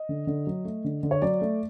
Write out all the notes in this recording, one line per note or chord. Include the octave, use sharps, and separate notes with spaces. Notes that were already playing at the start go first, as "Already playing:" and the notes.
Already playing: D#5
D3
D3
F#3
A3
D3
D3
C#5
F#3 D5
A3